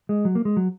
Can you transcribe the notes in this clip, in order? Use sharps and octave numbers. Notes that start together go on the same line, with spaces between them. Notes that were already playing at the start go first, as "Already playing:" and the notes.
G#3
F#3
A#3
G#3
F#3